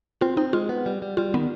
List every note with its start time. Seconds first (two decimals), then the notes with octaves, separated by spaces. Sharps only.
0.21 C4 F4
0.37 C4 D#4
0.53 G#3 F4
0.69 B3
0.86 G3
1.02 G3
1.17 G3 F4
1.34 D#3 B3